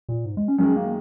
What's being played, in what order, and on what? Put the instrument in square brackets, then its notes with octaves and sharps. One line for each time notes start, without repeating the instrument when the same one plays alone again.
[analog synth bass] A#2
G#2
G#3
C#4
[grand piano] F#2 D#3 G#3 [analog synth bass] C#4
[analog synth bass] A#3